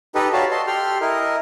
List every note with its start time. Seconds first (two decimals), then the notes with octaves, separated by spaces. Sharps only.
0.15 D#4 G4 A4 B4 D#5
0.33 F#4 G4 C#5 D5 F5 A5
0.51 A4 D#5 A5 C6
0.67 G4 A4 G5 C6 F6
1.01 E4 A#4 D#5